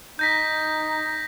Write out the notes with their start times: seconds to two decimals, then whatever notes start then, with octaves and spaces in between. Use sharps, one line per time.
0.19 D#4 G6 A#6 B6